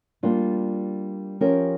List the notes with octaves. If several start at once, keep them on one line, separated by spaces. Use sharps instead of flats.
G3 A#3 D4 F4
F3 C#4 G4 A#4